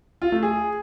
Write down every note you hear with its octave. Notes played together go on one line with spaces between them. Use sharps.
F4
A3
G#4